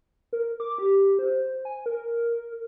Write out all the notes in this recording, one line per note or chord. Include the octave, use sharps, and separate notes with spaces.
A#4
D6
G4
C5
G#5
A#4